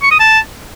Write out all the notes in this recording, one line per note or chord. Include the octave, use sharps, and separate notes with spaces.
C#6
D#6
A5